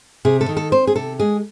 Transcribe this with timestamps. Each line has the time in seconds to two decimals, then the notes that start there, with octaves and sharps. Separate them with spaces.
0.25 C3 G#4
0.41 A4
0.49 D#3
0.57 A4
0.72 C4 C5
0.87 G#4
0.96 C3 A4
1.20 G#3 G#4